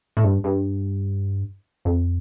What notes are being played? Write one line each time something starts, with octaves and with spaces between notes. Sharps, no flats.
A2
G2
G2
F2